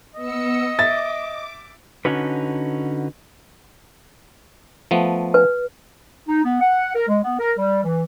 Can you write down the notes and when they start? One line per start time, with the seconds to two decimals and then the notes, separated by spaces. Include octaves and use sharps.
0.16 B3 D#5 E6 C#7
0.79 E5 D6 A6
2.05 D3 C#4 D#4 F#4 B4
4.91 F3 A3 B3
5.34 B4
6.28 D#4
6.44 B3
6.60 F#5
6.95 A#4
7.08 G#3
7.24 B3
7.39 A#4
7.58 G3
7.83 E3